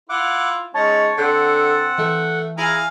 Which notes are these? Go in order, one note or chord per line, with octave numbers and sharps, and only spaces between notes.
E4 F4 F#5 D6
G#3 C#4 D#4 C#5 A5 A6
D3 C4 F#5
E3 A3
E4 G#4 F5 G#5 A#5